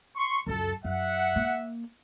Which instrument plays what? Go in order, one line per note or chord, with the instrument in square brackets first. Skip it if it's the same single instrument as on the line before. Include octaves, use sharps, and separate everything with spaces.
[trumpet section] C6 C#6
[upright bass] C#2 F#2 [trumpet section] A4
[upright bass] F#2 [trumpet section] E5 F#5
[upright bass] A#3